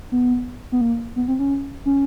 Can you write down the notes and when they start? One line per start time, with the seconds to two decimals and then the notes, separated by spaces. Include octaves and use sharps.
0.12 B3
0.72 B3
0.81 A#3
1.16 B3
1.28 C4
1.39 C#4
1.86 C#4